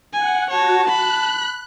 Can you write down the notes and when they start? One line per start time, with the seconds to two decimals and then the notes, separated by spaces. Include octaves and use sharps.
0.14 F#5 G#5
0.51 F#4 C#5 A5
0.88 B5 F#6